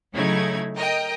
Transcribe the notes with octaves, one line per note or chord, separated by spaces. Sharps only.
C#3 F#3 A3 D#4 E4 G#6
A#4 D#5 G5